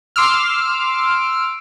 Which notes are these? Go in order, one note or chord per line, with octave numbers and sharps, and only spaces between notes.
C6 D6 E6 F6